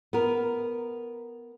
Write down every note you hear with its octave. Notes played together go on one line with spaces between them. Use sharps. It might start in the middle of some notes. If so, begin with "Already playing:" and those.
B3 A#4